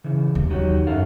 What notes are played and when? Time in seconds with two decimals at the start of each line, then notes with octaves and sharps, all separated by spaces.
0.04 C#3 E3
0.35 D#2
0.50 F#3 D#4 F#4 G4
0.87 F#2 A4 F5 F#5